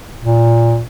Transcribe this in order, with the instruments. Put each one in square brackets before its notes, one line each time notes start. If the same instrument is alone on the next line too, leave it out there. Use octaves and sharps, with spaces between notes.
[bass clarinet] A#2